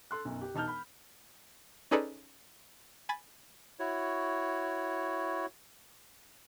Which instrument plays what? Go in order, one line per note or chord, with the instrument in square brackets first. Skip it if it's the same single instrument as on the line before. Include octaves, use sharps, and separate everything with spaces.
[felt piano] A4 C6 F#6
B1 F#2
G4
E1 D#4 A5 F6 G6
B5
[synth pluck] C#4 D#4 G#4 A4 B4 D5
G#5 B5 A6
[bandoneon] E4 F#4 C#5